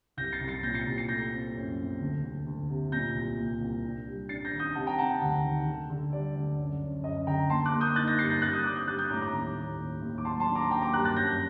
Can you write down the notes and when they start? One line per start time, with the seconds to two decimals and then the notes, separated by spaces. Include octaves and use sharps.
0.17 C2 G6 A#6
0.33 A6 C7
0.41 C2
0.48 A6 C7
0.63 A#2 G6 A#6
0.74 A6 C7
0.86 C2
0.98 A6 C7
1.09 A3 G6 A#6
1.32 C4
1.55 F#2
1.78 C4
2.01 D2
2.24 D2
2.47 D2
2.69 C3
2.92 A#2 G6 A#6
3.15 C2
3.38 A#3
3.61 C2
3.84 D4
4.07 G3
4.29 D4 A6 C7
4.45 G6 A#6
4.52 D#3
4.60 D#6 G6
4.75 C3 F#5 A5
4.87 G5 A#5
4.98 C3 F#5 A5
5.22 D2
5.44 D#3
5.67 D3
5.90 D3
6.13 G3 D5
6.36 D2
6.58 F#2
6.82 F#2
7.04 F#2 D#5
7.27 D3 G5 A#5
7.50 A#3 A5 C6
7.65 D6 F#6
7.73 A#3
7.80 D#6 G6
7.95 D#4 F#6 A6
8.07 G6 A#6
8.19 G2 A6 C7
8.30 G6 A#6
8.42 G3 F#6 A6
8.53 D#6 G6
8.64 D4 D6 F#6
8.76 D#6 G6
8.87 G3 F#6 A6
8.99 D#6 G6
9.10 A2 A#5 D6
9.22 A#5 D6
9.34 D#2
9.56 D#2
9.79 D#2
10.02 D#2
10.18 D6
10.25 F#3 A5 C6
10.40 A5 C6
10.48 D4
10.55 A#5 D6
10.71 A#3 G5 A#5
10.82 A#5 D6
10.94 G2 D6 F#6
11.05 F#6 A6
11.16 F#2 G6 A#6